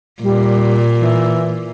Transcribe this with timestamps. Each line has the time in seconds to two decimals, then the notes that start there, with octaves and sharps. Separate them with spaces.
0.23 A#2 G3
0.99 E3